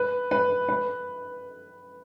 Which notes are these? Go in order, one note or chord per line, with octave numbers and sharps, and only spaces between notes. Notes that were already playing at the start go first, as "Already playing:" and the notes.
Already playing: B4
B4
B4